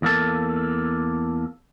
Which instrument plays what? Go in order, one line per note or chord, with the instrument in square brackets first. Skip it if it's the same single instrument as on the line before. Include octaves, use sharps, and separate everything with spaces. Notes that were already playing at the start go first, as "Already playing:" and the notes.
[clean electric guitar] E2 A#3 A4